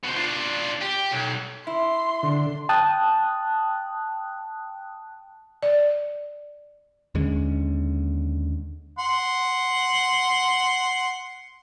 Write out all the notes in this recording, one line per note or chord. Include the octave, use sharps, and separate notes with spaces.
B2 C5
D4 F4
G4
B1
E4 C6
D3
G5 A5 D#6 F#6
D5
D#2 D3 G#3 C#4
F#5 C6